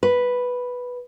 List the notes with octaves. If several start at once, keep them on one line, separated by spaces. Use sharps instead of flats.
B4